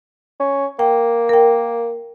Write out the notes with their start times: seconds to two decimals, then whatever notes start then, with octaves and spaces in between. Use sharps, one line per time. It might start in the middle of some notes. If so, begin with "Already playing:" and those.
0.40 C#4
0.79 A#3 G5
1.29 A#4 G5